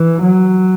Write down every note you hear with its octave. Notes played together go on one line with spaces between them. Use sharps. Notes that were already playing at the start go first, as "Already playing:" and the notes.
Already playing: E3
F#3